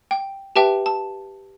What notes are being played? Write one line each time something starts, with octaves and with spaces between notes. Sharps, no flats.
G5
G4 B4 E5 G5 A5
A5